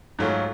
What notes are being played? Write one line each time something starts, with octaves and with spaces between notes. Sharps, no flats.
G#2 F#3 A3 F4